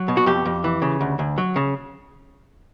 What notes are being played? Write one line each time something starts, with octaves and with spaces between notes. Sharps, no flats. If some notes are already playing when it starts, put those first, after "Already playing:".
Already playing: F#3
B2
F#4
F2 G4
F2
E3
C#3
D2
D2
F#3
C#3